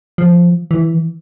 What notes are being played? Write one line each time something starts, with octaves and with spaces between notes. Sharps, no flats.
F3
E3